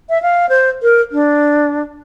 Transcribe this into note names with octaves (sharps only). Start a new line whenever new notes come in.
E5
F5
C5
A#4
D4